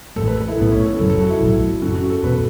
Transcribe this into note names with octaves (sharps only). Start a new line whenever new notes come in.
A1 A2 A3 A4
B4
A4
E4
B1 A2 A3 B3
C#4
A4
F#1 F#2 F#3 A4
A4
F#4
E4
B1 A2 F#3
F#1 F#2 F#3 C#4 F#4
F#4
A4
E2 B2 B3 B4